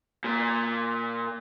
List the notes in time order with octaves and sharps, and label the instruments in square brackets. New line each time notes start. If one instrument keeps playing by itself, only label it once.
[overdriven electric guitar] A#2